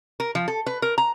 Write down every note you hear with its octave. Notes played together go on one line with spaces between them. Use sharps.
A#4
F3
A4
B4
A#4
A#5